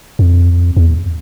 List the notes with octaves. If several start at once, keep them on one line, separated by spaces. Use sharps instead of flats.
F2
E2